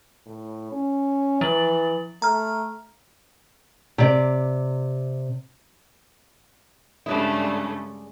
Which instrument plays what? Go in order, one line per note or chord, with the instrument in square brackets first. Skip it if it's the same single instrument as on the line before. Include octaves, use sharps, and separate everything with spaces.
[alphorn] A2
C#4
[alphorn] E3 [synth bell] F3 A6 F#7
[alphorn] A3 [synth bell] A#5 F6
[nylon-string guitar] C3 D5
[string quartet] G2 C#3 A3 [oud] G#3 D5 [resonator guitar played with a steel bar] D4 E4